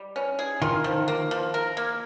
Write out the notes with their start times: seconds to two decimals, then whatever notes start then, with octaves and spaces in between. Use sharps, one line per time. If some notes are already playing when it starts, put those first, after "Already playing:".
Already playing: G3
0.16 C#4
0.39 G#4
0.62 D#3 F4
0.84 F3
1.08 A#3
1.31 F3
1.54 A#4
1.77 A#3